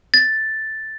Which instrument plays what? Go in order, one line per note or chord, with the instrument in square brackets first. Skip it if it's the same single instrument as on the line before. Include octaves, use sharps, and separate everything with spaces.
[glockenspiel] A6